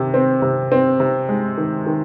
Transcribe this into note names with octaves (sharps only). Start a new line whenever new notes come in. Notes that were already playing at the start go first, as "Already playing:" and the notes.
Already playing: C3 D#3
C4
C3
C4
C3
G#3
D#3
D#3